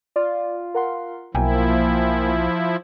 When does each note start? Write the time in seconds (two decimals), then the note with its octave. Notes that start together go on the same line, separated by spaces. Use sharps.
0.16 F4 D5
0.74 A#4 F#5 C6
1.35 B1 F3 A#3 E4 G5 G#5